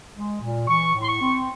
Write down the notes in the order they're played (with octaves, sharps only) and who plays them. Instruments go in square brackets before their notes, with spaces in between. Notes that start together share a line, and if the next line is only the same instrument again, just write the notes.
[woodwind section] G#3
A#2
E3 C#6
A2
C6
C#6
C4